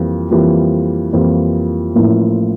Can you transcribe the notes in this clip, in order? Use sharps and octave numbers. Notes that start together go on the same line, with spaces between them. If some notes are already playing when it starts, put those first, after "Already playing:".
Already playing: F2 E3 G3 A#3 F4
F2 E3 G3 A#3 F4
F2 E3 G3 A#3 F4
A1 A2 F3 A#3 E4